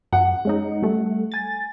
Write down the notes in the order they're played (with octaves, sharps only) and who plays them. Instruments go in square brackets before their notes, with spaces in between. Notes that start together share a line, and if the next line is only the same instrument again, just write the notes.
[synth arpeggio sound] F#2 [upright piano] F#5
[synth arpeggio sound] G#3 C#4 D#4
G3 A3
G#5 A6